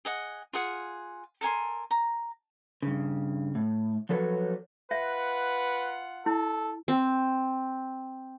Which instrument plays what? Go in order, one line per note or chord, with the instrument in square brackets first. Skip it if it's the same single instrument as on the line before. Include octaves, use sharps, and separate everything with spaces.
[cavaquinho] G#4 D#5 F#5
F4 G#4 F#5
A4 A#4 G#5 C6
A#5
[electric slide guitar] G2 C#3
A2
F3 F#3 A4 B4 C#5
[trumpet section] F4 F#5 [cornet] B4 [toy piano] E5
[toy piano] E4 [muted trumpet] A4
[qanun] C4